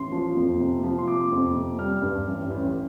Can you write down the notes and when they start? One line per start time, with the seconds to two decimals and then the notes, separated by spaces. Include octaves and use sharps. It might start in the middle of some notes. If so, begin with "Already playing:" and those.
Already playing: A1 C6
0.12 F3
0.36 F2
0.60 C3
0.83 F3
0.98 C6
1.07 C3 D6
1.32 F2
1.55 C3
1.78 G3 F6
2.02 G2
2.27 A1
2.50 A1